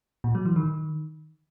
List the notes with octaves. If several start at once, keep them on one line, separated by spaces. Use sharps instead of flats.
A#2
F#3
E3
D#3